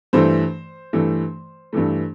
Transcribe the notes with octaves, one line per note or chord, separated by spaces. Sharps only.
G2 E3 A3 C5
G2 E3 A3
G2 E3 A3